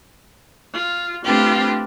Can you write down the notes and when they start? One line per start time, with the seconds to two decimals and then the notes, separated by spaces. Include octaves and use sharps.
0.73 F4
1.24 A3 C4 D4 F4 G4 B4